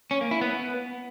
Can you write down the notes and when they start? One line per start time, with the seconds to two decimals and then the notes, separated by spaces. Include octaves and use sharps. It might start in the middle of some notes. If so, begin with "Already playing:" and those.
0.11 C#4
0.21 A#3
0.31 E4
0.41 B3